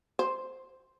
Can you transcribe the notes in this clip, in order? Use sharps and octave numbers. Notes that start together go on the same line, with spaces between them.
C5